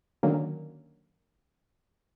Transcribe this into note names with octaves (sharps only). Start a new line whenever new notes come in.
D3 D#3 F#3 A#3 C#4